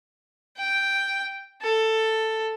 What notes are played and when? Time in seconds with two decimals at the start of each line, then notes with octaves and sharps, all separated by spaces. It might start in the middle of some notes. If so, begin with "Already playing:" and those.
0.57 G5
1.62 A4